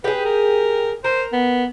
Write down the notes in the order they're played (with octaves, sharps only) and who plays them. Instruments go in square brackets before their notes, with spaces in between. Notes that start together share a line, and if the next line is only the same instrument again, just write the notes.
[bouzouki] G4 G#4 [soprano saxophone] B4
[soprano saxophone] A#4
[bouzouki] A#4 [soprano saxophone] C5
[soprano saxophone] B3